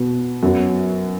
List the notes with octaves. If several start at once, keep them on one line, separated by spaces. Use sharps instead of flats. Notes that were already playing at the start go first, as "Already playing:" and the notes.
Already playing: B2 B3 F#4
F#2 F#3 B3